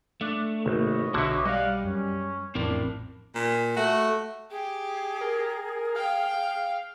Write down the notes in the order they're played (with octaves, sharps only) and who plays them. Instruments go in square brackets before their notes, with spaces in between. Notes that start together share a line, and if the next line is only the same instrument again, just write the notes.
[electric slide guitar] A3 [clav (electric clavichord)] D4
[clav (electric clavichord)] G#1 [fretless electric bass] C3 A#3 [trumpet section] B3 C#5 D#5
[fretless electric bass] B1 [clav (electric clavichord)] D3 [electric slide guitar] F#4 E5
[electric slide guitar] G3 G4 [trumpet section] D5 F5 F#5 [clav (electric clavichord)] D#5
[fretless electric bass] F#2 [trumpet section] C#4
[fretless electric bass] A1 F2 [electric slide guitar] C4 E4 A#4 [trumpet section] D4
[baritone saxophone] A#2
[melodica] A3 [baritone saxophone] F#4
[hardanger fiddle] G4 [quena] G#4
[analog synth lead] A#4
[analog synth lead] F5 [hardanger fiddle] G5